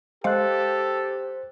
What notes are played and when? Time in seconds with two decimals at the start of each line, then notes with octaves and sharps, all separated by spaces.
0.24 G#3 G4 A4 C5 F5 F#6